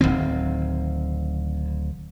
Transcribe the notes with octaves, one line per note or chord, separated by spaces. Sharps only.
D1 C#2 D#3 C4